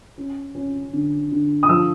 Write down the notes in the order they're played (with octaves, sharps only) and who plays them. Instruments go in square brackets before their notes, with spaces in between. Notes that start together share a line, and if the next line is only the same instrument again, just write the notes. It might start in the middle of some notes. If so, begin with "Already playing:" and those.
[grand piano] C#4
C#4
D3
D3
D#6
F3 E6